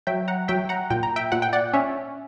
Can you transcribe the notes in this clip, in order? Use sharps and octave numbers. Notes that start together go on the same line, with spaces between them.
F#3 E5 G5
F#5 A#5
F#3 E5 G5
F#5 A#5
A#2 G5
A#5
E5 G5
A#2 F#5
G5
D5 F#5
C#4 C#5 E5